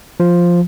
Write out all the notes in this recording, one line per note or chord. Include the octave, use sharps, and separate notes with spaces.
F3